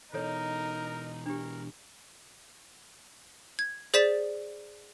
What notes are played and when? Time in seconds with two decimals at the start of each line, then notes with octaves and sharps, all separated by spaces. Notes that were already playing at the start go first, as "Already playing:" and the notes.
0.14 B2 E3 D#4 A4 A#4 C#5 D#5
1.26 D4 G4 A#4
3.59 G#6
3.94 G#4 C5 D5 A6 B6 E7